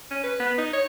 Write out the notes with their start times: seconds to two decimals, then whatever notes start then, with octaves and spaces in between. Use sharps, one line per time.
0.10 C#4
0.23 B4
0.40 B3
0.58 D#4
0.73 C#5